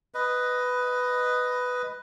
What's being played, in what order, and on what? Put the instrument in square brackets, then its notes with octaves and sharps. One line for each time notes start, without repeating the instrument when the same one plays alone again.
[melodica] B4 D#5